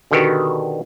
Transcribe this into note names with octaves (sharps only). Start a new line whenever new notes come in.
B2 D3 D#3 B3 F#4 G4